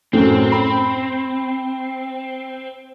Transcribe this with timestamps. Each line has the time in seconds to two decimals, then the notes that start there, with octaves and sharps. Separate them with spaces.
0.13 F#2 A2 C4
0.52 B5